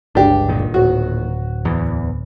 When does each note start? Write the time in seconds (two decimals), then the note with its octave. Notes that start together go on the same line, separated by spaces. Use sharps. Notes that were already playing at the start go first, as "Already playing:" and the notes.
0.15 G1 C#2 G2 D4 G4
0.48 A#2 D#3
0.74 D1 F#4
1.65 E2 E3